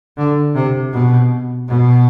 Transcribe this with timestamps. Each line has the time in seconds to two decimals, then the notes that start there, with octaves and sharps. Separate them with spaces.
0.17 D3
0.55 C3
0.93 B2
1.68 B2